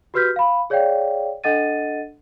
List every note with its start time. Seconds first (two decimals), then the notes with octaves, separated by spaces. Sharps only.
0.14 F#4 G4 B4 F6 G6 B6
0.36 F5 B5
0.70 G#4 C#5 D5 F5 G5
1.44 D4 A4 D#5 F#5 A6 D#7